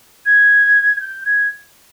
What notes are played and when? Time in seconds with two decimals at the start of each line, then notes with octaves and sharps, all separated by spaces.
0.25 G#6
0.95 G#6
1.00 G6
1.25 G#6